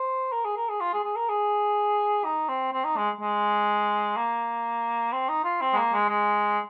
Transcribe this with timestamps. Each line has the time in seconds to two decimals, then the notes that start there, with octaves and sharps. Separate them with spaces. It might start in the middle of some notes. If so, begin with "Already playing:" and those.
Already playing: C5
0.32 A#4
0.45 G#4
0.56 A#4
0.69 G#4
0.81 F4
0.93 G#4
1.04 G#4
1.16 A#4
1.29 G#4
2.25 D#4
2.49 C4
2.73 C4
2.85 D#4
2.97 G#3
3.21 G#3
4.17 A#3
5.13 C4
5.29 D#4
5.44 F4
5.61 C4
5.73 G#3
5.77 A#3
5.93 G#3
6.09 G#3